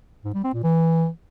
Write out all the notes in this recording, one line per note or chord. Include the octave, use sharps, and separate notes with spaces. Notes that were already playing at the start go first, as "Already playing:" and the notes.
G#2
G3
C4
A#2
E3